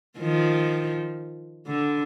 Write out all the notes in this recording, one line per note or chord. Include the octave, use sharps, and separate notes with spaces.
D#3 F3
D3